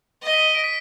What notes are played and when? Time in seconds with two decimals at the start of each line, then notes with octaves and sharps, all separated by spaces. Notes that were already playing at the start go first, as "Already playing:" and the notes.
0.22 D#5
0.34 B6
0.55 D7
0.64 B6